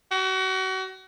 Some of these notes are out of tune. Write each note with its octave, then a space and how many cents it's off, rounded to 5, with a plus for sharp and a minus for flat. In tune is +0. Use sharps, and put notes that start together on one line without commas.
F#4 +35